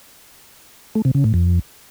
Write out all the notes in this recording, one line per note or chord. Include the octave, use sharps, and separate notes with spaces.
A3
C3
C#3
A2
F2